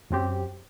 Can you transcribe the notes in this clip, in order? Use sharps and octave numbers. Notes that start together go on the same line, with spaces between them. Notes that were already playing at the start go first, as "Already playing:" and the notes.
F#2 F#3 C4 G4